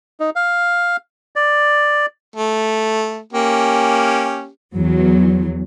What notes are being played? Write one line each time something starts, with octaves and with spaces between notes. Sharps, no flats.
D#4
F5
D5
A3
A#3 C#4 G4
E2 F#3